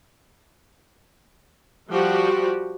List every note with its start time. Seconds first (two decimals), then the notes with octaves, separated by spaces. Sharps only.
1.91 F3 G3 F#4 G4